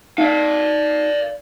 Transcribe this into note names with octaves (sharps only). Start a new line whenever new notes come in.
D#4 D5 F5